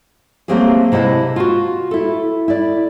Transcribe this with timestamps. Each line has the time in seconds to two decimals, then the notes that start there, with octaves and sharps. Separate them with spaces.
0.48 F#3 A3 A#3 C4 G4 G#4
0.92 C3 E4 D#5 F#5 A5
1.36 F4 F#4
1.91 E4 A4
2.48 E4 D5